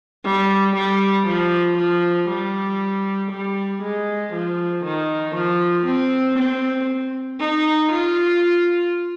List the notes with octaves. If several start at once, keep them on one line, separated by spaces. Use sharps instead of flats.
G3
G3
F3
F3
G3
G3
G#3
F3
D#3
F3
C4
C4
D#4
F4